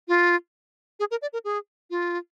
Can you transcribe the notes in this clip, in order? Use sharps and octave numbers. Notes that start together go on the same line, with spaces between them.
F4
G#4
A#4
D5
A#4
G#4
F4